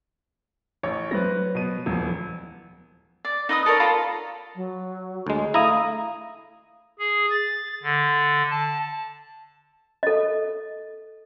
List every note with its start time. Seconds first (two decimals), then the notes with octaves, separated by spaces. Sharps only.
0.83 A1 C#5 C#6
1.11 F#3 B4 C5 A#6
1.55 B2 B3 D#7
1.86 D#1 E2 F3
3.25 D5
3.49 D#4 B4 D#5 D#6
3.66 A4 A#4 C#5 D5
3.80 F4 A4 A#5 B5
4.56 F#3
5.27 D2 G#3
5.54 A3 E4 F5 A#5 D#6
6.99 G#4
7.30 A6
7.83 D3
8.51 A5
10.03 A4 D#5